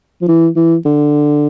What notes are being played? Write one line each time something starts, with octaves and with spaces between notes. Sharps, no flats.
F3
E3
E3
D3